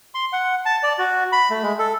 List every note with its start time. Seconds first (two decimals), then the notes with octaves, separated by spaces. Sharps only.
0.15 C6
0.33 F#5
0.66 A5
0.83 D5
0.99 F#4
1.32 B5
1.50 A3
1.62 G#3
1.79 A4